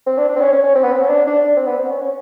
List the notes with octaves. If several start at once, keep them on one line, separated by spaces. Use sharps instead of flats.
C4
D4
D4
C4
C#4
C#4
C#4
C4
B3
C4
C#4
D4
D4
D4
C4
B3
C4
C#4
C#4